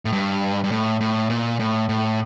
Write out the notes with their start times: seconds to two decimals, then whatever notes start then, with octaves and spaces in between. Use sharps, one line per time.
0.05 A2
0.12 G2
0.64 G2
0.71 A2
1.01 A2
1.30 A#2
1.59 A2
1.89 A2